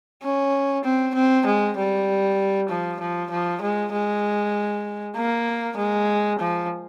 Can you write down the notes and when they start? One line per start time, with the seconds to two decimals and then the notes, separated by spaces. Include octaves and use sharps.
0.23 C#4
0.84 C4
1.15 C4
1.46 G#3
1.77 G3
2.69 F3
3.00 F3
3.31 F3
3.61 G#3
3.93 G#3
5.16 A#3
5.77 G#3
6.39 F3